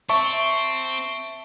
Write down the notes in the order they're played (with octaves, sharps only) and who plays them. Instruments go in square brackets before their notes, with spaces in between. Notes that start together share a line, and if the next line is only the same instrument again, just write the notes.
[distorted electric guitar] C4 [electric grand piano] E5 A5 C#6